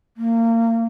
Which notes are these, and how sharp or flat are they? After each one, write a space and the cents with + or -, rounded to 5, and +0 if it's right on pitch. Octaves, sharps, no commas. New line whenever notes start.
A#3 -30